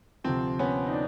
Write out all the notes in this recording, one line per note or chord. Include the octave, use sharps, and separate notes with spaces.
D2 C3 F3 C4
B3 C#4
D#4
D4